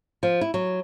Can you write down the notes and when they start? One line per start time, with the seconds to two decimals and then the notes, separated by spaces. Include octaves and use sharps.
0.23 F3
0.41 E4
0.54 F#3